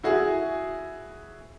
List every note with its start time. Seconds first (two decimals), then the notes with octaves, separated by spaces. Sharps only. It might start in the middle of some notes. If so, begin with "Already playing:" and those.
0.03 E4 F#4 G#4